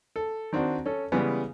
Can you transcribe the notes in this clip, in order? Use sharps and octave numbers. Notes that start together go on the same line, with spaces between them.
A4
D#3 C4 D4 F#4
C#4 A4
C#3 E3 G3 G#3 B3